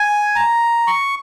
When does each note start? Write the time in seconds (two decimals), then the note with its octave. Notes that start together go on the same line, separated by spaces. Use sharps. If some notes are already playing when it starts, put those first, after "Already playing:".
Already playing: G#5
0.35 A#5
0.87 C#6